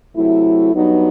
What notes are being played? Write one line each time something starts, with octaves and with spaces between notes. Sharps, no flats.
C3 F#3 A3 E4
G2 F#3 B3 D#4